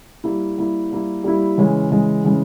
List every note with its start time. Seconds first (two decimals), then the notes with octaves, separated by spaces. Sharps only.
0.24 G3 A#3 E4
0.58 G3 A#3 E4
0.91 G3 A#3 E4
1.24 G3 A#3 E4
1.58 C#3 E3 G#3 C#4
1.91 C#3 E3 G#3 C#4
2.24 C#3 E3 G#3 C#4